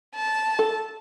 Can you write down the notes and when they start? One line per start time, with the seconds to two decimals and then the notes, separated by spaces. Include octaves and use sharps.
0.15 A5
0.59 A4